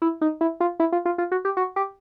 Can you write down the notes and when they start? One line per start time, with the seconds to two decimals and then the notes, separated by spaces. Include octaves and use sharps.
0.02 E4
0.21 D#4
0.41 E4
0.60 F4
0.80 E4
0.92 F4
1.05 F4
1.18 F4
1.32 F#4
1.45 G4
1.57 F#4
1.76 G4